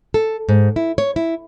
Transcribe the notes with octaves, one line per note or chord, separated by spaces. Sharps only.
A4
G#2
E4
C#5
E4